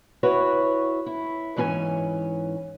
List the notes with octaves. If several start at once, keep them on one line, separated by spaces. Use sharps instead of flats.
E4 F#4 B4 C#5
E4
G#2 E3 C#4 A4 G#5